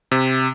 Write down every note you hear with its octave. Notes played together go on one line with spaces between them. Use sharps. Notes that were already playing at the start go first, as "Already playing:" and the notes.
C3